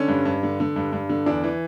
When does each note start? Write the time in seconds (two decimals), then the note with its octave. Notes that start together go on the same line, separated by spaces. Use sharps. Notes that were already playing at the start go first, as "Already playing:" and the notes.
Already playing: D3 C#4
0.08 G2
0.26 G2
0.43 D3
0.60 D3
0.76 G2
0.93 G2
1.09 D3
1.26 E2 D4
1.44 E3